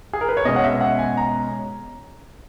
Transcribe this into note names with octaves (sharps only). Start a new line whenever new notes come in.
G#4
A#4
B4
C#5
B2 G#3 C#4 D#5
F#5
E5
F#5
G#5
A#5